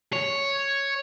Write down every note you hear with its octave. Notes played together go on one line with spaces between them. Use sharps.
C#5